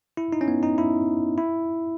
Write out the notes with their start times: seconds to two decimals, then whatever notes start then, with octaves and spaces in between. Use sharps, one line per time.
0.17 E4
0.33 D#4
0.41 C#4
0.48 B3
0.63 D#4
0.78 E4
1.38 E4